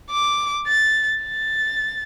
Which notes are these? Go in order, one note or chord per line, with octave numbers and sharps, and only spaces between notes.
D6
A6
A6